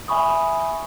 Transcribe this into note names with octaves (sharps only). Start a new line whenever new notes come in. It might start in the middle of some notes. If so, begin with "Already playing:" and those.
E5 G#5 B5 C#6 D#6